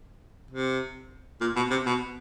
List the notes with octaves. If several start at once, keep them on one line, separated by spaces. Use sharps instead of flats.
C3
A#2
B2
C3
B2